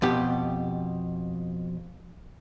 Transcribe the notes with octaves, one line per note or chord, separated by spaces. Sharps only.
F2 B2 G4